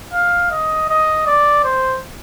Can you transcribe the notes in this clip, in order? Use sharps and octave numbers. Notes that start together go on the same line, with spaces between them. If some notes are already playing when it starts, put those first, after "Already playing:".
F5
D#5
D#5
D5
C5